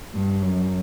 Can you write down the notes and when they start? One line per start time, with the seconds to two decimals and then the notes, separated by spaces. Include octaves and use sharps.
0.14 G2
0.43 F#2